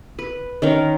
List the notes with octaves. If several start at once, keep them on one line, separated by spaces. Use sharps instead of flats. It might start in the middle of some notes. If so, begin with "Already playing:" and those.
B4
D#3 C#4 A#4